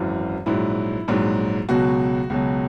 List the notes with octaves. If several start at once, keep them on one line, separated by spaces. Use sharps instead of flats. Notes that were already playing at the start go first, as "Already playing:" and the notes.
Already playing: G#1 F#2 E3
A#1 G#2 F#3 E4
A#1 G#2 F#3
C#2 B2 F#3 F#4
C#2 B2 F#3